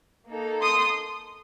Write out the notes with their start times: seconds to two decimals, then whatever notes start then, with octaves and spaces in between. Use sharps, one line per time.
0.28 A#3 D#4 A4
0.62 C6 D#6